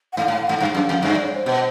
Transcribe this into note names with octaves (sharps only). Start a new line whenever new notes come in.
F#5
G#2 F5
A2 F#5
F5
G#2 F#5
G2 F5
F#2
F2
G2 E5
D5
C#5
C5
B2